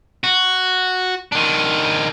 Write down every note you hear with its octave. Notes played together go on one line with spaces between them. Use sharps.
F#4
D#3 D4